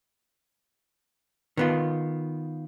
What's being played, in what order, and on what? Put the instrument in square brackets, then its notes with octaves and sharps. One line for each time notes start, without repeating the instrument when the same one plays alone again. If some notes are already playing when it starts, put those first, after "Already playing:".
[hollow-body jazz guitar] D#3 B3 F4